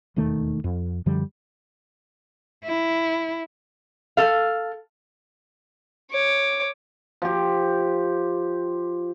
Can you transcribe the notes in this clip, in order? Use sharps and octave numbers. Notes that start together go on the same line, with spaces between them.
E1 D#2 D#3 A3
F2
F#2 D3 F3 G3
E4
A4 F5
C#5 D6
F3 G4